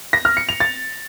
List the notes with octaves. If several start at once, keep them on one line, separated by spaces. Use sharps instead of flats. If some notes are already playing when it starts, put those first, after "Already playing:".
A#6
F6
C#7
F7
A6